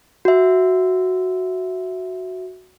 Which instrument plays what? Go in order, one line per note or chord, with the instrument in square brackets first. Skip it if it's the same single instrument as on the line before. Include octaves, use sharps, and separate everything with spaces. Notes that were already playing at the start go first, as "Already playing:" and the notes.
[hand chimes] F#4 E5